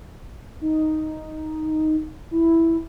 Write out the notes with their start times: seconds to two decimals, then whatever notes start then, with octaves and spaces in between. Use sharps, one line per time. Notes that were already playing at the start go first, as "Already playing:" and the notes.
0.61 D#4
2.31 E4